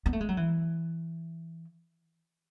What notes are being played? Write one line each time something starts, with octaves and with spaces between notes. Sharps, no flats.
B3
A3
G#3
F#3
E3